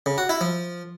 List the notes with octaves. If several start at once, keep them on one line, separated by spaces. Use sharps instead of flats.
C#3
F#4
E4
F3